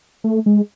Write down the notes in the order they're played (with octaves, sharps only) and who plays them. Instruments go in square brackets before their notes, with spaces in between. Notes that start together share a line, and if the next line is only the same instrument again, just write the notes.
[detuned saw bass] A3
G#3